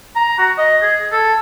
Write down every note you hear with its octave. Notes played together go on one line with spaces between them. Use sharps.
A#5
F#4
D#5
G#4
A4